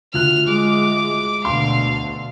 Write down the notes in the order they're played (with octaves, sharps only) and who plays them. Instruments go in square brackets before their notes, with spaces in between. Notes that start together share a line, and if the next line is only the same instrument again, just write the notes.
[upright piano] D2 F4 F#6 [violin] F6
[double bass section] G#3 [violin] D6
[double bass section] D2 B2 D3 [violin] F5 [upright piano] C6